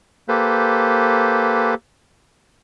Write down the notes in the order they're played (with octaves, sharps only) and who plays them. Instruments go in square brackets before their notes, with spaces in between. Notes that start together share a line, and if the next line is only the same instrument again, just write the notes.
[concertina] A#3 G4 A4 B4 C5